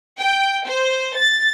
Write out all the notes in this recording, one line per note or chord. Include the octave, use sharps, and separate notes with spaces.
G5
C5
A6